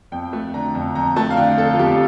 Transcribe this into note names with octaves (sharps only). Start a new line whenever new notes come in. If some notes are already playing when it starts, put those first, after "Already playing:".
F2 G5
A3
D3 A#5
F2
F2 A#5
A3 A5
F5
D3 G5
F2 A4
F4
F2 G4